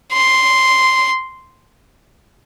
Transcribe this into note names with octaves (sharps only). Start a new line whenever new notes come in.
C6